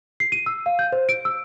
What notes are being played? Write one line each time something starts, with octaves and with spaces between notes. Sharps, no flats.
C7
D#7
E6
F5
G6
C5
D7
E6